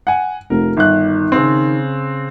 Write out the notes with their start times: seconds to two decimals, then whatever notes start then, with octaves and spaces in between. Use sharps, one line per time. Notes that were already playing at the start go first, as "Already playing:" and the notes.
0.07 F#5 G#5
0.50 F1 A#4
0.77 G1 D#3 F#6
1.32 C#3 C4